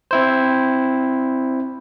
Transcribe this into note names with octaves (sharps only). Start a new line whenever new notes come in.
C4 E4 C5